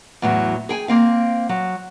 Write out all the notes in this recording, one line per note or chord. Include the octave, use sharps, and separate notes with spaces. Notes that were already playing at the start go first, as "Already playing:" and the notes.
E2 A2 F#3
G#4 G5 G#5
A#3 C4 F5
F#3